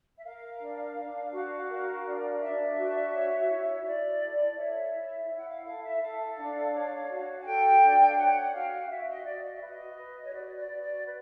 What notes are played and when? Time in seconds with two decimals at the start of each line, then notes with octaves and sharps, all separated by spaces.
0.16 E5
0.24 A#4 F5
0.60 D4
0.96 D4
1.32 F#4
1.69 A#4
2.04 D4
2.40 D4 E5
2.77 F#4
3.13 C#5
3.49 E4
3.85 E4 D5
4.20 A4
4.57 C#5 E5
4.93 E4
5.29 E4
5.38 F#5
5.47 F5
5.64 A4 F5
5.83 E5
6.00 A4 F5
6.37 D4
6.73 C#5
7.09 F#4
7.41 G#5
7.45 A4 G5
7.82 D4
8.09 F5
8.16 C#5 F#5
8.53 F#4 F5
8.89 F#4 E5
9.08 D#5
9.25 F#4 D5
9.44 D#5
9.54 E5
9.61 B4
9.66 D#5
9.98 B4
10.23 C#5
10.33 F#4 D5
10.57 D5
10.70 F#4
10.82 D5
11.05 B4